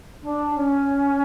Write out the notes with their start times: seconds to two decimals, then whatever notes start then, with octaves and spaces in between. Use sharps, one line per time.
0.23 D4
0.54 C#4